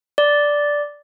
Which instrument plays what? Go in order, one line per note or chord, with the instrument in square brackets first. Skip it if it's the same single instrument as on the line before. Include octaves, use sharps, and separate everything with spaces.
[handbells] D5